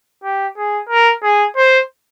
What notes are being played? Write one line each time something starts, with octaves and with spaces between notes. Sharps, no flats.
G4
G#4
A#4
G#4
C5